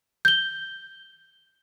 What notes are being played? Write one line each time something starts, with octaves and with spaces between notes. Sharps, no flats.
G6 G7